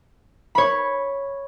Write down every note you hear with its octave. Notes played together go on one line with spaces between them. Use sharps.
C#5 B5